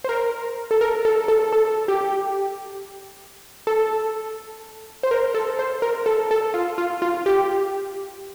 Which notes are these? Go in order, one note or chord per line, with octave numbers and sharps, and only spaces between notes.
C5
A#4
A4
A#4
A4
A4
A4
G4
A4
C5
A#4
A4
C5
A#4
A4
A4
F4
F4
F4
G4